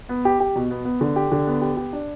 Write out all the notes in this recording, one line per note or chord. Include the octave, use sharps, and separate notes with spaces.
B3
G4
G4
B2
B3
B3
D3
G4
D3
B3
G4
G4
D4